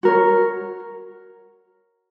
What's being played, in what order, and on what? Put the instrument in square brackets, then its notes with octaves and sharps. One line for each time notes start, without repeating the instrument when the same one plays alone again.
[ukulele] F#4 A#4 C#5